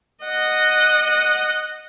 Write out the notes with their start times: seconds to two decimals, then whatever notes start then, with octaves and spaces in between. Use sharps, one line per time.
0.25 D#5 F#5